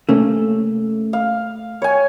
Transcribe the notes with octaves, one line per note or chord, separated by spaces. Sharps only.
C3 A3 A#3 C#4
F5
C#5 G#5